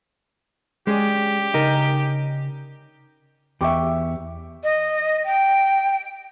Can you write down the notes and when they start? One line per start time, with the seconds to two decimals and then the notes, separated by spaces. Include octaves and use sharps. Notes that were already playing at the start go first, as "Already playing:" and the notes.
0.87 G#3 C#4 G4 G#4 D5
1.54 C#3 D#4 A#4
3.61 E2 G4 E5 C#6 D6
4.64 D#5
5.25 G5